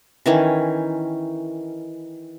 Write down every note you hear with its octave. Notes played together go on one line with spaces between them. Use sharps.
D#3 E3 C#4